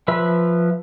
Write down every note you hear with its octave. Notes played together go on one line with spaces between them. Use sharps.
F3 B4 E5 E6